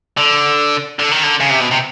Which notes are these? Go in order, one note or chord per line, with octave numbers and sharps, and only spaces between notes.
D3
D3
D#3
D3
C#3
C3
B2
C3